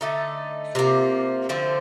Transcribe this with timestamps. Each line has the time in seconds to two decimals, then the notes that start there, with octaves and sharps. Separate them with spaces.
0.01 D3 A3 D#4 A4
0.75 C3 F3 A#3
1.49 D3 F3 A3 C4